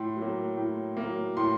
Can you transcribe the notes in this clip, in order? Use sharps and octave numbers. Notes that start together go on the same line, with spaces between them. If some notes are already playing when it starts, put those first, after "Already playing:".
Already playing: A2 C6
F#3
A#3
A2
F#3 A#3
A2 C6